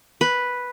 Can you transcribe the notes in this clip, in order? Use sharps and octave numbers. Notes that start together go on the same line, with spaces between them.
B4